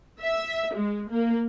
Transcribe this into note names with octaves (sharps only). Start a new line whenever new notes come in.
E5
G#3
A#3